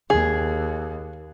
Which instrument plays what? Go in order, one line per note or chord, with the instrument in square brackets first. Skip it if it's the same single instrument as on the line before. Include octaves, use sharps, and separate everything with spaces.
[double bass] D#2 [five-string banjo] G#4